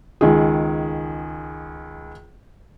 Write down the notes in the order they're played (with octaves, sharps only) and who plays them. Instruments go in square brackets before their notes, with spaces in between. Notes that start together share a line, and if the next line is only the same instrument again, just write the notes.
[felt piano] C#2 D#3 G#4